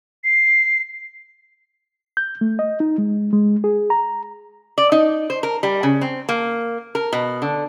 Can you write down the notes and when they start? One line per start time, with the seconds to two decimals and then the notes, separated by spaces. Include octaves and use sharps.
0.24 C7
2.17 G6
2.41 A3
2.59 D#5
2.80 D#4
2.98 G#3
3.33 G#3
3.64 G#4
3.90 A#5
4.78 D5
4.92 D#4
5.30 C5
5.43 A#4
5.63 G3
5.83 C#3
6.01 C4
6.29 A#3
6.95 A#4
7.13 B2
7.42 D3